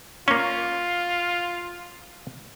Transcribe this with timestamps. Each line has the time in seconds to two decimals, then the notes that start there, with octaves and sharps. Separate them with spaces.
0.28 A#3 C#4 F4